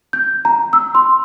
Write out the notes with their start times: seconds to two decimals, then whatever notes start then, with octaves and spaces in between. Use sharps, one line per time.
0.13 G6
0.45 A#5
0.73 E6
0.95 C6